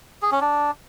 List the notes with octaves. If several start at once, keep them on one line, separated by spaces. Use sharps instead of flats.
G#4
C#4
D4